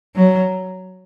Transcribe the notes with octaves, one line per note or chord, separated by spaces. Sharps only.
F#3